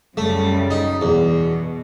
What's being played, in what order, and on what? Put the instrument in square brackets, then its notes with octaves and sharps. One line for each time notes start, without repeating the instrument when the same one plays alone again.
[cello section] F#2 C#3 G3 [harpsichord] A3
[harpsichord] D#4
[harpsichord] E2 [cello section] B2